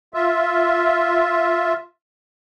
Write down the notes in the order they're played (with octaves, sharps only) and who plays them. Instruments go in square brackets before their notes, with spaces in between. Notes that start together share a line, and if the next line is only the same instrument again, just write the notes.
[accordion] F4 E5